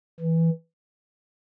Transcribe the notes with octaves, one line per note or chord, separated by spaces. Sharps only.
E3